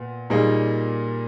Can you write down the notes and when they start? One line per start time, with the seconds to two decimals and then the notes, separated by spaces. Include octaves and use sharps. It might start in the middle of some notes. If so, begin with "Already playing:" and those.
Already playing: A#2 B3
0.30 A#2 G3 A#3 D#4 G#4